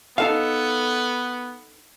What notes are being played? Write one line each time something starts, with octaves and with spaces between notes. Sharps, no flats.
B3 D#4 A4 F5